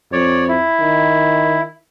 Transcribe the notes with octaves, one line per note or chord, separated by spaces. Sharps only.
F2 C#5 D5
E4
D#3